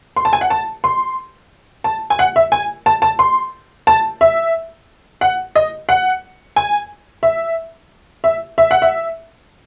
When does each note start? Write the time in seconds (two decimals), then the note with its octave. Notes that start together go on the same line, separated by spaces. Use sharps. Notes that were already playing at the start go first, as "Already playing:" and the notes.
0.16 C6
0.25 A5
0.33 G#5
0.41 F#5
0.50 A5
0.84 C6
1.84 A5
2.10 G#5
2.19 F#5
2.36 E5
2.52 G#5
2.86 A5
3.02 A5
3.19 C6
3.87 A5
4.21 E5
5.21 F#5
5.55 D#5
5.89 F#5
6.56 G#5
7.23 E5
8.24 E5
8.58 E5
8.71 F#5
8.82 E5